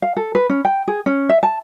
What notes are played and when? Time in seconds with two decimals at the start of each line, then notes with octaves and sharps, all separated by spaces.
0.02 F5
0.17 A4
0.35 B4
0.50 C#4
0.65 G5
0.88 G#4
1.06 C#4
1.29 E5
1.43 A5